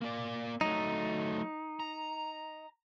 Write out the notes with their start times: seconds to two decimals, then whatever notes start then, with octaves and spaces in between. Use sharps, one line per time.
0.01 A#3 D5
0.61 F#3 A3 D#4
1.80 A#5